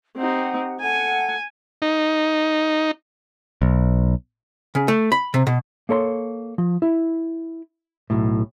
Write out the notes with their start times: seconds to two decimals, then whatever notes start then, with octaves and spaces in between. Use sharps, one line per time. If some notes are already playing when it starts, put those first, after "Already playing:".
0.17 C4 D#4 G4 F#5
0.81 A4 F#5 G#5
1.82 D#4
3.62 B1
4.75 C#3
4.88 A3
5.12 B5
5.34 C3
5.47 B2
5.89 A#3 A4 C#5 B5 C6
6.58 F3
6.82 E4
8.10 B1 A2